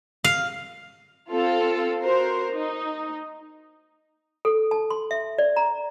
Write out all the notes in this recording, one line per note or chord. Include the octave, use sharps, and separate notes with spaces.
F5
C4 F4 A4
F#4 A#4 C5
D#4
A4
A5
C6
E5
D5
A#5